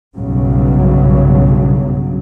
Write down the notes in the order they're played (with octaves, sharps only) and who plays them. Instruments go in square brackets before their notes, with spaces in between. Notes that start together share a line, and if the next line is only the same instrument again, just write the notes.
[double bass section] B1 G2 C#3 F#3